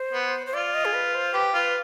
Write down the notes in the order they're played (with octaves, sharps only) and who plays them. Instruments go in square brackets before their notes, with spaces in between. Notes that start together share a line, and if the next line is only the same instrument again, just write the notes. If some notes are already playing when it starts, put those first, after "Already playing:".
Already playing: [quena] C5
[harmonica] B3
[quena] C5
[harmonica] F4 [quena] D5
[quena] D#5
G#4
B4
C5
[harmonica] G4 [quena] B4
[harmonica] F4 [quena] B4